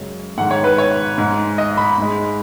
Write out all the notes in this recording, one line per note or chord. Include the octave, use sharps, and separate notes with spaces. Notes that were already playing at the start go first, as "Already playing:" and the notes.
Already playing: F#2 C#3 G#3
G#2 D#3 G#3 F#5
C#5
B4
C#5
G#2 G#3
D#5
B5
G#2 G#3